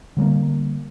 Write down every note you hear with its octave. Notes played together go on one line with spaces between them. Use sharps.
D3 G3 A3 A#3